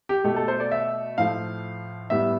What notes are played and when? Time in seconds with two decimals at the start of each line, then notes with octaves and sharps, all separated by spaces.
0.09 G4
0.24 B2 A3 G4
0.36 A4
0.48 C5
0.60 D5
0.72 E5
1.18 A2 F3 A3 F5
2.10 A2 G3 B3 E5